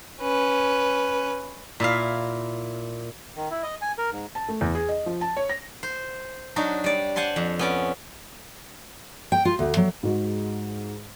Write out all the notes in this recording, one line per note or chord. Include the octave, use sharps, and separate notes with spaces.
C#4 B4
A#2 E4 F5
D#3
E4
D#5
G#5
A#4
G#2
A5
A3
E2
G#4
D#5
F3
A5
C#5
A#6
C5
F#3 D4 D#4 F#4
G3 D5
C5 F#5 G#5 A5 C6
F2
B3 C#4 D5
G5
F4
D2
F#3
G#2 G#3 F#4